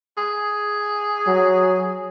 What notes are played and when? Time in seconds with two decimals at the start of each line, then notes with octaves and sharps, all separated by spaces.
0.17 G#4
1.27 F#3